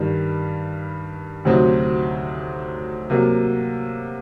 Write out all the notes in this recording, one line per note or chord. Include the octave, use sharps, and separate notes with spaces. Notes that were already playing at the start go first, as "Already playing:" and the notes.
Already playing: G2 D#3 G3
D2 C3 F#3 C4 D#4
C3 F#3 A#3